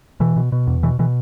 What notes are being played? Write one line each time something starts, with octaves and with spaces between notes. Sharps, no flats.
B2 E3
B2
B2
E2
B2 E3
B2 E3